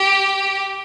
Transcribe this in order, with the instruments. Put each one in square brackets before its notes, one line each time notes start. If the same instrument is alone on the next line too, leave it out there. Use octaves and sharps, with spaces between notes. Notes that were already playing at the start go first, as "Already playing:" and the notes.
Already playing: [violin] G4